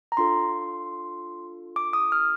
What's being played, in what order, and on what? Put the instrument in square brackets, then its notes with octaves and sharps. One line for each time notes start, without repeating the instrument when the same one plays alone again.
[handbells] A#5
D4 F4 A4 C6
D6
D#6
F6